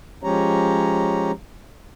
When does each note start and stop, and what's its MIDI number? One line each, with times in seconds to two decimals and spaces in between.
0.23 1.31 53
0.23 1.31 56
0.23 1.31 61
0.23 1.31 67
0.23 1.31 73
0.23 1.31 82